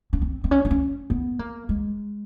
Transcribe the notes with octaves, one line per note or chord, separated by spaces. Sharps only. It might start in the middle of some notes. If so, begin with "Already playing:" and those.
C#4
C4
C4
C#4
D4
C#4
B3
A#3
G#3